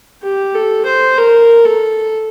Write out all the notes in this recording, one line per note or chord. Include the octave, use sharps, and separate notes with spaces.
G4
A4
C5
A#4
A4